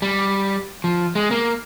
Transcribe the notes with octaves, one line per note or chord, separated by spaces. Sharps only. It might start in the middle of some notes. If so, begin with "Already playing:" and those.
G3
F3
G#3
A#3